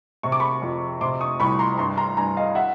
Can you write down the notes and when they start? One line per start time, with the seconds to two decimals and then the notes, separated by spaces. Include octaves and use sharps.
0.23 C3 C#6
0.32 D6
0.40 B5 C#6
0.62 F2
1.01 C3 C6 D6
1.21 C#6 D#6
1.40 C2 B5 C#6
1.59 A#5 C6
1.78 G2 A#5 C6
1.97 A#5 C6
2.17 G2 G#5 A#5
2.37 D#5 F5
2.55 E5 F#5